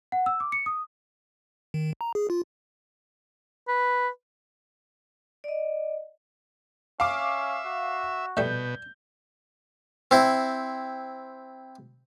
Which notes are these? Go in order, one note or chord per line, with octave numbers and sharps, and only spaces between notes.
F#5
E6
D6
C#7
D#6
D#3
A#5
G#4
F4
B4
D5 D#5
C#4 E5 F5 D6
F#4
A#1 B2 G3 A3 G6
C4 E4